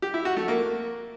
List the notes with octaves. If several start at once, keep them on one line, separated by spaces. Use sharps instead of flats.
G4
E4
F#4
A3
A#3